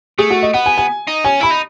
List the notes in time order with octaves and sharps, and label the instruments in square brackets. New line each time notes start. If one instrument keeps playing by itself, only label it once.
[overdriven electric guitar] A3 [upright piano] G#4
[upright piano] F#4
D#5
[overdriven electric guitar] B3 [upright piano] F#5
[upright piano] G#5
G#5
[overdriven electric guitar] D#4
[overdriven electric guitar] C#4 [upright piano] G#5
[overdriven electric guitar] E4 [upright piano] B5
[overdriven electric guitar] D#4